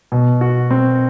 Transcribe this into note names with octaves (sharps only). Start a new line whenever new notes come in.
B2
F#4
C4